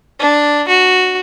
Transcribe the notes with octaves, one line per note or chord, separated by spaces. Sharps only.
D4
F#4